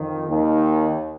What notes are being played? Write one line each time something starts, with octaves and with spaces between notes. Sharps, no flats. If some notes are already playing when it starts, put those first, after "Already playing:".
Already playing: F2 D#3
D#2 D#3